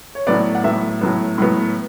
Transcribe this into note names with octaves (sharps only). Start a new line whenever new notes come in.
C#5
A2 F#3 B3 D5
F#5
A2 F#3 B3 E5
A2 F#3 B3
A2 F#3 B3